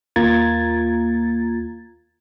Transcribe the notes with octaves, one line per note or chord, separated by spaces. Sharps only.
D#2 A#3 F4 A#5 G#6 A6